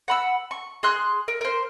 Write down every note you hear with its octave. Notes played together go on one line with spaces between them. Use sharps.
F#5 B5 E6
C#6
G#4 C6 F#6
A#4
A#4 C5